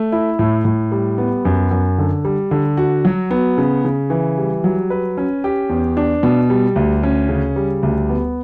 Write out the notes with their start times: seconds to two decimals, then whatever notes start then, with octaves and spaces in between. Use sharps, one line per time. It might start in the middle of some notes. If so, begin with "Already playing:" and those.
Already playing: A3
0.12 E4
0.39 A2
0.65 A2
0.92 G3
1.18 B3
1.45 F#2
1.71 F#2
1.98 D3
2.25 G3
2.51 D3
2.77 F#4
3.05 F#3
3.31 B3
3.58 C#3
3.85 C#3
4.10 E3
4.38 G3
4.64 F#3
4.90 B4
5.17 C#4
5.44 G4
5.69 E2
5.97 D4
6.23 B2
6.50 G3
6.76 D2
7.03 C#4
7.29 C#3
7.56 G3
7.83 D2
8.09 B3